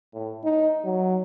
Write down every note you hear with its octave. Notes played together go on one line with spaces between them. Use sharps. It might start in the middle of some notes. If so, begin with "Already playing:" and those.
A2
D#4
F#3